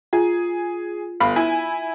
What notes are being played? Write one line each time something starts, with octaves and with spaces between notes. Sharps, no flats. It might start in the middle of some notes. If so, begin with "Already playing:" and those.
F4 G#4
G1 F5 B5
E4 G#5